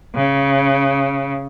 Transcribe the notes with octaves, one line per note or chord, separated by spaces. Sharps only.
C#3